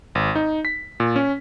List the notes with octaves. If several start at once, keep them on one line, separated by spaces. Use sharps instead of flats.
G#1
D#4
B6
A#2
C#4